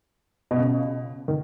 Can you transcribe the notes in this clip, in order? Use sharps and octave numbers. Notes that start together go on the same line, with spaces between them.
B2
C#3
D#3